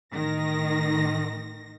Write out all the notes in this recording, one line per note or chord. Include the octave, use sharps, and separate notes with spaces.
A1 D#3 A#6